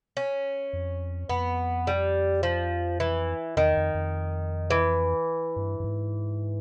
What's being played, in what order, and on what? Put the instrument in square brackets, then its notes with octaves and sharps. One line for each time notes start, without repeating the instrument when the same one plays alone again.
[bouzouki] C#4
[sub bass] F2
[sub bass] F2 [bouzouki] B3
[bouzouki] G3
F3
E3
[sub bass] E2 [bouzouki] D#3
[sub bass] F2
F2
[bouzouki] E3
[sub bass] G2
G2
G#2